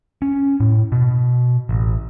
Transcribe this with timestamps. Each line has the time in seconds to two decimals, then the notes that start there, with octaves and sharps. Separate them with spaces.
0.22 C#4
0.60 A2
0.92 B2
1.69 A1